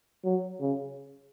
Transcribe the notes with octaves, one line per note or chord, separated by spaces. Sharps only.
F#3
C#3